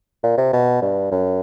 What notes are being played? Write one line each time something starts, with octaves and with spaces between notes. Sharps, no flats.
A#2
C3
B2
G2
F#2